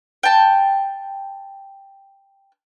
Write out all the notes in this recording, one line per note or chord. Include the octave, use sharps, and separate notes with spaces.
G5 A5